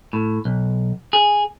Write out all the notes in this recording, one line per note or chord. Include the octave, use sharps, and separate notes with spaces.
A2
B1
G#4